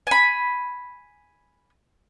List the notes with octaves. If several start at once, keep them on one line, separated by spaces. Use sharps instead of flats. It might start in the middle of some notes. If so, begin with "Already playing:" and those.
G#5 B5